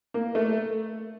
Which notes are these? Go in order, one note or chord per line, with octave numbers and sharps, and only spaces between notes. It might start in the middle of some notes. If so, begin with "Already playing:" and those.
A#3
A3